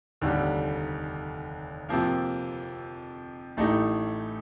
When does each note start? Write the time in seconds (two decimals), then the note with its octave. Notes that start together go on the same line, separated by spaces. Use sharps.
0.21 F1 D#2 D3 G3
1.89 F2 C3 F3 A#3
3.57 A1 A2 A3 D#4 G4